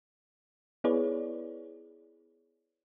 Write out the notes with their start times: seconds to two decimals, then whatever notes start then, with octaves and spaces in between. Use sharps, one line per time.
0.84 B3 E4 G#4 B4 C#5 D5